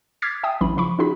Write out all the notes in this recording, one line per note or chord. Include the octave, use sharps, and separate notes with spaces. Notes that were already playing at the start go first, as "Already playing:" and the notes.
D6 F6 G#6 A6 B6 C7
E5 G5 G#5 D#6
A1 E3 F#3 C#4 E4 B5
C#3 F3 B5 C#6
C#4 D#4 F4 F#4 G#4 B5